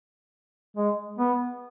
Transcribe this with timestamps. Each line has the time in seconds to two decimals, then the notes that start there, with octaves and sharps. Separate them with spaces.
0.77 G#3
1.19 B3